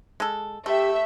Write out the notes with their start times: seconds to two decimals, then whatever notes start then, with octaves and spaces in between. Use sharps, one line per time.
0.20 G#3 A4
0.66 A3 G4 E5